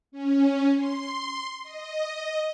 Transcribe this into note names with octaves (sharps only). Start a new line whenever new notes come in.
C#4
C6
D#5